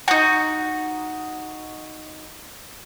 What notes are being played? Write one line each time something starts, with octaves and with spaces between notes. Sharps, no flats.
D#4 F#4